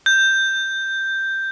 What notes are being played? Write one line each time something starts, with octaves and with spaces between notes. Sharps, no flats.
G6